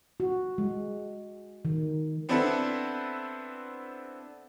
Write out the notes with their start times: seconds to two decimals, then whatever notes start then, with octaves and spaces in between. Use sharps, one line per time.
0.20 F#4
0.58 G#3
1.65 D#3
2.29 B3 C4 D4 E4 A4 B4